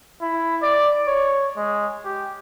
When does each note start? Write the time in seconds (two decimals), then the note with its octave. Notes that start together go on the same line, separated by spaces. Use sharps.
0.21 E4
0.62 D5
1.06 C#5
1.56 G#3
2.05 G4